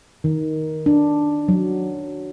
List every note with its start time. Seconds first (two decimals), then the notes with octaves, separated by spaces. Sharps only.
0.24 D#3
0.86 D4
1.48 F#3